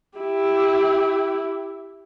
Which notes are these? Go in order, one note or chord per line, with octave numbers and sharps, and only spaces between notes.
E4 G4